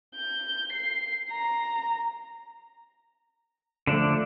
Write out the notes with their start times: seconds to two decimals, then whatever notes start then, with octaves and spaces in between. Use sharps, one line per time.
0.15 G6
0.73 C7
1.31 A#5
3.87 D3 F3 A3 D4 D5